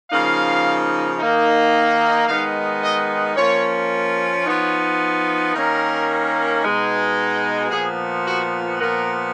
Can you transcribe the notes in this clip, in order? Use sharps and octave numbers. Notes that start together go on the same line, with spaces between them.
C#3 F3 A#3 D#4 F5
D#3 A#3 D#4
D#3 G#3 B3 D#4 F5
D#5
F3 A#3 C#4 C#5
F3 B3 D#4 C#5
D#3 A#3 C#4 A#4
B2 G#3 D#4
A#2 F3 B3 G#4
F#4
A#2 F3 B3 A#4